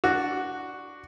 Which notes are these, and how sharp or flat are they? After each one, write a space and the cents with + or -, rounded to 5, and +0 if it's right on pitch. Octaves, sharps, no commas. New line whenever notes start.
D4 +0 F#4 +0